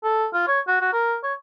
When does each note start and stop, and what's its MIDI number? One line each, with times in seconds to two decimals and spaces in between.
0.04 0.26 69
0.33 0.44 65
0.48 0.60 73
0.68 0.78 66
0.81 0.92 66
0.93 1.17 70
1.23 1.34 73